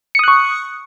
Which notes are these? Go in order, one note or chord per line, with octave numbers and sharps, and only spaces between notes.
C#6 D#6 F#6 C#7